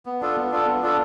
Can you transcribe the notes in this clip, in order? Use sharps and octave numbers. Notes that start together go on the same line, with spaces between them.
B3
D4 F4 A4
B3
D4 F4 A4
B3
D4 F4 A4